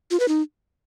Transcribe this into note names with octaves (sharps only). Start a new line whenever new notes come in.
F4
B4
D#4